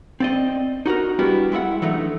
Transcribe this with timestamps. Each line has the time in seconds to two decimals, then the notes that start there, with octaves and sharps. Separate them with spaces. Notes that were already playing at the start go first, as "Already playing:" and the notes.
0.20 C4 D5 D#5
0.86 D#4 F#4 G4 A#4
1.19 G3 B3 D4 E4 F#4 G4
1.52 G#3 E4 E5 F#5
1.82 E3 F#3 A3 D4 D#4